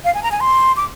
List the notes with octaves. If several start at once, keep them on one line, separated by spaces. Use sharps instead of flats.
F5
G#5
A#5
G#5
C6
D6